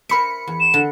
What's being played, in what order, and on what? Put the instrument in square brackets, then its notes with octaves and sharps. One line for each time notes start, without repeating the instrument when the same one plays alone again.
[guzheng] A#4 C5 E5 [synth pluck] B5 C#7
[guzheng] E2
[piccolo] E7
[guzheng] D3